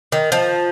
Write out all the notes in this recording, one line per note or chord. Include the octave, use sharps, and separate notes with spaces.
D#3
F3